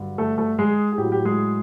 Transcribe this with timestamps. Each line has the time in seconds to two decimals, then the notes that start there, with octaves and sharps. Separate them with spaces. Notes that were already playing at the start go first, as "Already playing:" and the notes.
Already playing: G2 D3 F#3
0.18 A3 A4
0.38 A3 A4
0.58 G#3 G#4
0.92 G#4
0.98 A2 F#3 G4
1.12 G4
1.25 G#3 G#4